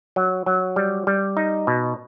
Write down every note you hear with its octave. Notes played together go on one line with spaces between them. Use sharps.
F#3
F#3
G3
G3
D#4
B2